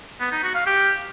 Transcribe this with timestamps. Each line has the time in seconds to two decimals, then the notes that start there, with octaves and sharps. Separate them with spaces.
0.20 B3
0.32 D#4
0.43 F#4
0.55 F5
0.66 G4